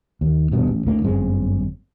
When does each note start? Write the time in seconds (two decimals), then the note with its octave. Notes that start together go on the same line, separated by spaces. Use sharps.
0.21 D#2
0.51 D#1 G2 B2 B3
0.67 A1
0.87 D2 A2 D3 A#3
1.02 G1 F#2 G#3 C4